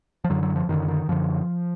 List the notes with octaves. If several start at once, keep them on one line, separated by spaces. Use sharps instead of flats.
F3
F#2 D3 F#3
F#3
F3
F#2 D3 D#3
D#3
F#2 D3 F3